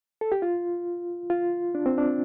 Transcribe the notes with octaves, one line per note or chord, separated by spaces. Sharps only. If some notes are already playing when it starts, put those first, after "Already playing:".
A4
G4
F4
F4
D4
C4
D4